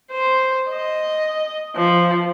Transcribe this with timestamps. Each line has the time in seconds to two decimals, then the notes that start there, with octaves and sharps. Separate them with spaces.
0.11 C5
0.70 D#5
1.76 F3